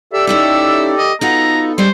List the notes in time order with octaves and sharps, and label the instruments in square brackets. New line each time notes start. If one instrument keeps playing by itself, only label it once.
[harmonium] G4 A4 D5 [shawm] E5
[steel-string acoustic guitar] C#4 D#4 E4 [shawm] E5
[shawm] D#5
[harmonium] B3 A4 [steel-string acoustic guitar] D#4 F4 F#4 [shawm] A#5
[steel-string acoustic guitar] G3 G#3 C#4 [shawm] C5